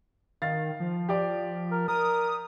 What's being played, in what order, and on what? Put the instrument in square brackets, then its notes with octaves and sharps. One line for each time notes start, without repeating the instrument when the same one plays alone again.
[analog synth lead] D#3 [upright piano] F5 A6
[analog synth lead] F3
[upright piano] G4 D5
[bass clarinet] A#4
[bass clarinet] A#4 [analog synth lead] D#6